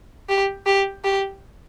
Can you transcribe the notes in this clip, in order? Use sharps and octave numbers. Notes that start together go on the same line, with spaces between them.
G4
G4
G4